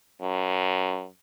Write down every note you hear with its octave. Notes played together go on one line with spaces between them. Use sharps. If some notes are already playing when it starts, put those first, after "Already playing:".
F#2